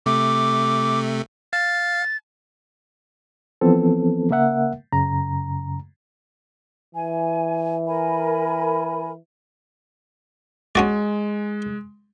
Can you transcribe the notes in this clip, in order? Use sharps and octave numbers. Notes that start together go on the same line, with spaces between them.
C3 A3 D6
F5 A6
E3 F3 B3 C4 A4
C#3 A#3 A#4 E5 F#5
F#2 C#3 A#5
E3 G#5
A#4 G#5 B5
G#3 C#4 F#4 D5